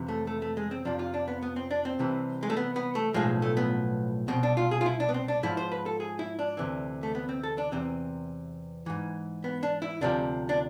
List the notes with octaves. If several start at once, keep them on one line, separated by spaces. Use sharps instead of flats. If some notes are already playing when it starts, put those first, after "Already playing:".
Already playing: F2 C3 E3
A3
A3
A3
G#3
C4
F2 C3 F3 D4
F4
D4
B3
B3
C4
D4
C4
C2 C3 E3
G#3
A3
B3
B3
A3
B1 A2 F3 G#3
A3
B3
C2 B2 C4
D4
F4
G#4
F4
E4
D4
B3
C4
D4
G#2 F3 E4
C5
B4
A4
G#4
E4
D4
D2 C3 E3
A3
B3
C4
A4
D4
E2 C3 E3 C4
G#2 E3
B3
D4
E4
D2 C3 F3 D4
D4